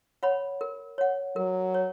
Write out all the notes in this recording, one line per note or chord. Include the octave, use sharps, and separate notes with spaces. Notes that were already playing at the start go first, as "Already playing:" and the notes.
C#5 F#5 B5
A#4
C#5 F#5
F#3 A#4
C#5